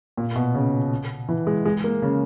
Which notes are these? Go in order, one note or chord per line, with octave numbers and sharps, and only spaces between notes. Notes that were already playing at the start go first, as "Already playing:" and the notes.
A#2
B2
C#3
E3
G#3
G#3
A#3
C#3